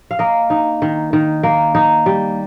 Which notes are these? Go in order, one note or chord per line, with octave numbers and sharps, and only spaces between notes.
F5
A#3 D#5
D#4
D#3
D#3
A#3
D#4
G3